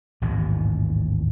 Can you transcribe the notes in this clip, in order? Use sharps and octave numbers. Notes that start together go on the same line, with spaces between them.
A1 D#2 G#2 B2